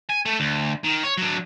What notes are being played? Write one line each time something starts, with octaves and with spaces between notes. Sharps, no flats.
G#5
A3
D2
D#3
C#5
F#3 D4